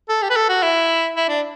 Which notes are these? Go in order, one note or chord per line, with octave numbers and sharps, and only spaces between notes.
A4
G4
B4
A4
F#4
E4
E4
D4